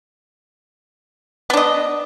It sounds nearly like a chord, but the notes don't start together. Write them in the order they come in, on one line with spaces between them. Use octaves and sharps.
B3 D4 D#5